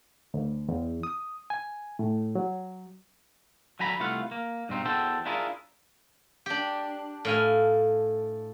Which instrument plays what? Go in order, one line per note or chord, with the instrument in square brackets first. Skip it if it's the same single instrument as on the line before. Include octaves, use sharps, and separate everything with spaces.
[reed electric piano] D2
E2
D#6
G#5
A2
F#3
[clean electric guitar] D3 F#3 G#5 A#5 B5
C2 A3 F4 B4 F5 F#5
A#3
G2 B2 C4 D#4
E2 F#4 A4 C5 G5
D4 E4 F4 G#4 A#4
[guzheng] D4 G4
A2 F5 G#5